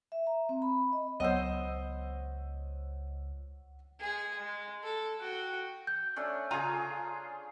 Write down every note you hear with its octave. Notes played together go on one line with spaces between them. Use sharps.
E5
A#5
C4
B5
D#5
C#2 F#3 B3 C5 C#5 D#5 F#5 E6
G#3 G#4
G#3
A4
F#4 G5
G6
A3 C#4 D4
C#3 F4 G#4 G#5 A#5